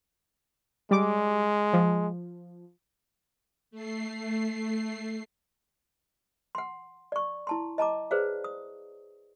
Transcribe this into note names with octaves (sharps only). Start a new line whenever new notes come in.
G3 G#3 D6
F3
A3 C7
F#5 C6
D5 C#6
E4 A5 C6
D#5 A5 A#5 D6
G#4 B4 C5 D5 F5
D#6